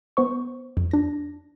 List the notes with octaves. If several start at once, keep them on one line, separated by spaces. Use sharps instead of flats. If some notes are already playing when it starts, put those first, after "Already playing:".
B3 C5 C#6
F2
D4 A#6